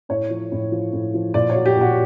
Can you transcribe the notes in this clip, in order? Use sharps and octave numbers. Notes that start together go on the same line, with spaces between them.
A2 C#5
F3
A2
F3
A2
F3
A#2 D5
C#5
F#3
G4
A#2
F#4